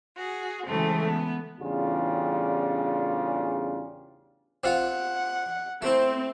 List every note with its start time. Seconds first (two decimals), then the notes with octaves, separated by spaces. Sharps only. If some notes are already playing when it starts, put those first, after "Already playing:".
0.17 F#4 G#4
0.65 C#3 E3 F#3 G#3 A3 C4
1.05 B3
1.61 A1 E2 C#3 G3 D4 F4
4.64 C4 F4 F5 F#5
5.82 A3 C4 E4